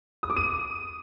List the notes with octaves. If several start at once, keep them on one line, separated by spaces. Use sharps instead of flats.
D#6
D6
D#7